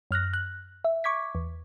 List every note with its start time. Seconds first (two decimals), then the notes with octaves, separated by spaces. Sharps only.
0.11 F#2 F6 F#6 A#6
0.33 F#6
0.84 E5
1.04 C#6 D6 G#6 B6
1.35 E2